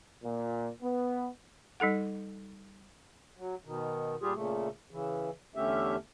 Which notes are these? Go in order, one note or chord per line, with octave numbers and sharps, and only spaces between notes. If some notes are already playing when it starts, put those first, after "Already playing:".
A#2
B3
G3 D#4 A4 F#5
F#3
B2 D#3
A#2 G3 F4 G4 G#4
A#2 C#3 A3
C#3 E3
E2 D3 A3 C#4 G4 E5